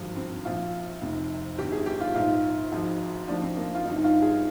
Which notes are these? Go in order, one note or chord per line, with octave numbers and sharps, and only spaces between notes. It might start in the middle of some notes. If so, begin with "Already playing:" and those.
Already playing: G#1 G2 D3 F3
C4
A#1 A#2 F3 F4
F1 F2 C3 D#3
G1 G2 D#3 G4
G#4
G4
F4
A#1 G#2 D#3 F4
G#1 G#2 F3
D#2 D3 F3 D4
C4
A#3
F4
G1 G2 D#3 D#4
D#4
F4
G#4